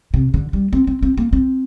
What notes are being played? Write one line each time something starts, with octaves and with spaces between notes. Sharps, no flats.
C3
D3
G3
C4
C4
C4
A#3
C4